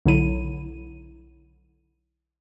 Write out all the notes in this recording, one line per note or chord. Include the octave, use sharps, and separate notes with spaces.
B1 D3 F#3 E4 D#7